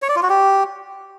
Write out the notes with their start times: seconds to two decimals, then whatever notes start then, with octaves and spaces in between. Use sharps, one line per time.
0.02 C#5
0.09 D5
0.16 F4
0.23 F#4
0.30 G4